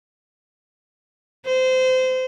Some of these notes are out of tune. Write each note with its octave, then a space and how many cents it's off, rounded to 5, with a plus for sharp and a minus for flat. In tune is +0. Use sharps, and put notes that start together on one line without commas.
C5 -25